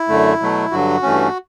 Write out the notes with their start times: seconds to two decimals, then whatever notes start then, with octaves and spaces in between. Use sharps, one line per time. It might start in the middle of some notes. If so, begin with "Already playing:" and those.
Already playing: E4
0.09 F#2 D3 A3
0.40 B2 F#3 A3
0.71 G2 D3 F#3 F#4
1.03 G2 E3 A3 C#4